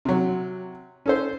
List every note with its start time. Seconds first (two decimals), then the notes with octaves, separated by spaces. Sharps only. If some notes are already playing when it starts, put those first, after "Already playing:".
0.05 C3 F#3
1.06 C#4 A4 C5